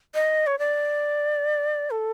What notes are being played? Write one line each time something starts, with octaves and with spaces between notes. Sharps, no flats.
D#5
C#5
D5
A4